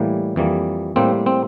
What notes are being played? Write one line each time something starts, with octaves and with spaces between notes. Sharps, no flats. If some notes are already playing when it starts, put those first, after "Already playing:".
Already playing: A2 E3 G3 A#3
F2 E3 G3 A#3
A2 G3 A#3 C4
C4